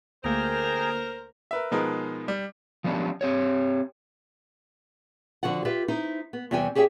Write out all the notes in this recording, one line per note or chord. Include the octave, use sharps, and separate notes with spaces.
D2 A3 A#3 G#4 A#4 C5 G5 A#5
A#4 B4 E5
B2 F3 G#3 D#4 A#4 B4
G3
F3 A3 B3 C#4 D4 G4
C4 G4 C#5
D3 F3 F#4 D5 F#5
F4 G4 B4 E5
D#4 E4 C5
B3
E2 C3 G3 C5 G5 G#5
G4 G#4 C#5 E5 G5